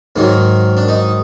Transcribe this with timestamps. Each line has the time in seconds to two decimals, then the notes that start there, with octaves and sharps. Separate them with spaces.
0.16 G#2 D#3 F#3 A#3
0.77 D4
0.88 D#4